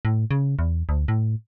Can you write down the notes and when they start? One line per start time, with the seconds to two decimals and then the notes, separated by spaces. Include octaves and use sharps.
0.05 A2
0.31 C#3
0.59 E2
0.89 D2
1.08 A2